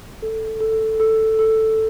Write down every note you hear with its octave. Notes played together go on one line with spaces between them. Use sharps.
A4
A4
A4
A4